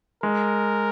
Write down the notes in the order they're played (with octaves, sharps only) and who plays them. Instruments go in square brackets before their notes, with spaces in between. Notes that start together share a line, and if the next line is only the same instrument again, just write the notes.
[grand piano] G#3 [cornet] A#4